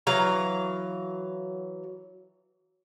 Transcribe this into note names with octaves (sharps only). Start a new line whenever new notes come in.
E3 F#3 F5 A#5